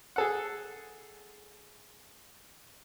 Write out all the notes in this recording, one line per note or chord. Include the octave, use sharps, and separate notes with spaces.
G#4 A4 F#5